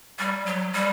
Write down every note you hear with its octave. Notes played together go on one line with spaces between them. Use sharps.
G3
F#3
G3